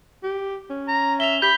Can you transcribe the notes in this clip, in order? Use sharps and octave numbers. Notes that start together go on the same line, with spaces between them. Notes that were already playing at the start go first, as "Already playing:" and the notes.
G4
C#4
A#5
E5 F7 G7
G4 B5 G6 G7